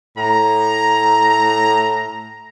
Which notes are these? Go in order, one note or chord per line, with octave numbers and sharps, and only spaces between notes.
A2 A#5